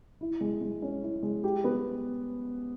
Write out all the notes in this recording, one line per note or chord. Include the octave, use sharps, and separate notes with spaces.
E4
G#3
G#3
C#4
E4
G#3
G4
B3